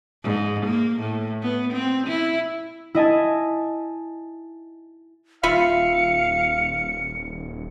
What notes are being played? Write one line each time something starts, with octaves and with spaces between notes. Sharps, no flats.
G#2
A#3
A2
B3
C4
E4
E4 D#5 G#5 A5
D#1 F4 E5 F5 B5 C#7